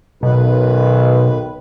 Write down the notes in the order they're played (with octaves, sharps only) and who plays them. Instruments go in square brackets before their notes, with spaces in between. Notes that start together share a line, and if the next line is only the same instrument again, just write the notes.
[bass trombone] B1 [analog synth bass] B2 [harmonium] D#3 B4